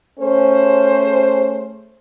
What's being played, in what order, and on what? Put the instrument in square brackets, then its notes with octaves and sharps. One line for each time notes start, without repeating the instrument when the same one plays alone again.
[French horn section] A3 G#4 C5 [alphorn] C#4